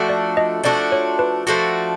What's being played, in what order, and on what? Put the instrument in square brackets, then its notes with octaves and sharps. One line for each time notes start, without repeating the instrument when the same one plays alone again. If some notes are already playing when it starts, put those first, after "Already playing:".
Already playing: [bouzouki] F3 A3 D4 F#4
[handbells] D5
D#5
[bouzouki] F3 A3 D4 F#4 [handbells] D5
[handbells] C#5
B4
[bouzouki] F3 A3 D4 F#4